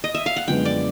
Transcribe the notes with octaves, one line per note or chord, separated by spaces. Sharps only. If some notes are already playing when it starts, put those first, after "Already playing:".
D#5
E5
F5
F#5
F#2 D3 F3 G#3 B3 G5
D5